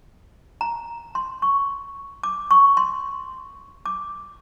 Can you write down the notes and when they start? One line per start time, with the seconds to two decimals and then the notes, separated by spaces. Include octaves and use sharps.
0.61 A#5
1.15 C6
1.42 C#6
2.23 D6
2.51 C#6
2.77 C6
3.86 D6